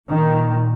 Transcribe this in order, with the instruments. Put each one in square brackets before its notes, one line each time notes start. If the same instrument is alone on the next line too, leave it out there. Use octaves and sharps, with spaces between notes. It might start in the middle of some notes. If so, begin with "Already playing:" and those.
[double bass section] A#2 D#3